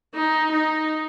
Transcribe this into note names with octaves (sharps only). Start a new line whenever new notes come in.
D#4
D#4